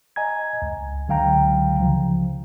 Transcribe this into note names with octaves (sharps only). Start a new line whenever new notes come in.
D#5 G#5 A#5 G#6
C#2
C#2 D3 F#3 F5 G5 A#5
C#3 F3